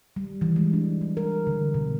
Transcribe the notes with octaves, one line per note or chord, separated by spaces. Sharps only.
G3
E3
G#3
D4
G3
A#4
D3
B2